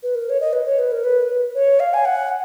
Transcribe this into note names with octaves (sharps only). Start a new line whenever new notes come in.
B4
A#4
C#5
D#5
B4
C#5
B4
A#4
B4
C#5
F5
G#5
F#5